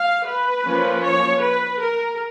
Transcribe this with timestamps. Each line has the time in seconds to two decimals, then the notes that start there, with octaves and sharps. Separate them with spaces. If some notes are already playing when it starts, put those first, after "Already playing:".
Already playing: F5
0.27 B4
0.66 F3 A#3 C#4
1.03 C#5
1.41 B4
1.79 A#4